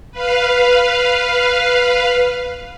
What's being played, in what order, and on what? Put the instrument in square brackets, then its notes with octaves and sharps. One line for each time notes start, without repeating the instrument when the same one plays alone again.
[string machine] B4 F5